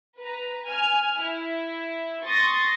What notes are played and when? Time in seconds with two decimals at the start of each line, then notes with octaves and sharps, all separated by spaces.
0.20 B4 A#5
0.67 G#5 F6
1.20 E4
2.24 C6 C#6 D#6 A6 A#6